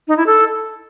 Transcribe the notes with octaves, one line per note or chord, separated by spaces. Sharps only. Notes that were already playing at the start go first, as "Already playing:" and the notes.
D#4
E4
A4